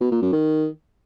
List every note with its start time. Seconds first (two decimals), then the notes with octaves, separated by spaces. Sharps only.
0.01 B2
0.11 A#2
0.22 F#2
0.32 D#3